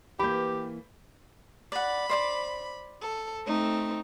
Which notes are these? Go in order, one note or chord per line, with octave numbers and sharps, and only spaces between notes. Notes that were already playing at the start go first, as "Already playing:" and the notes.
E3 A#3 G4 B5 G6
D5 F#5 B5
C5 D5 D6
A4
A3 C4 D#4